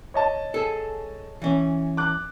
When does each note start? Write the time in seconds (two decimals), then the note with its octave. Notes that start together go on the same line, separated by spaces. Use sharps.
0.14 C#5 D#5 A5
0.54 G#4 A4
1.42 E3 C#4
1.97 D6 F#6